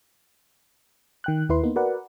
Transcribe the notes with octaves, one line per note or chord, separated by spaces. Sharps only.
D#3 G5 F#6
D#2 E4 B4 C6
A#3 B3 D#4
F#4 A#4 B4 D5 F#5